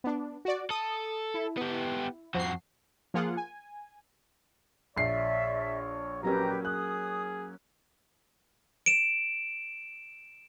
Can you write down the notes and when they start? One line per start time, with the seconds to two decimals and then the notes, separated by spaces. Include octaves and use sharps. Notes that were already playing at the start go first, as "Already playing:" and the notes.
0.04 B3 D4
0.45 F#4 D5
0.70 A4 D#6
1.34 E4
1.58 B3 G4
2.34 F2 F3 F#4 C7
3.14 F3 A#3 F4 G#4 F#5
3.37 G#5
4.97 A#1 C#5 D5 E5 C7
6.23 F#3 A#3 C#4 G4 B4 A#5
6.65 G#4 D#6 F#6
8.86 D7 E7